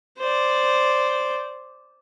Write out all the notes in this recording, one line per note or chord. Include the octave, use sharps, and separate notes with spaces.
C5 D5